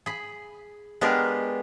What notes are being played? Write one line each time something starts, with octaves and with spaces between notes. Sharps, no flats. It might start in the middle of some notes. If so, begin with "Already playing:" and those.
G#4 B5
G#3 B3 D4 G4 G#4 A#4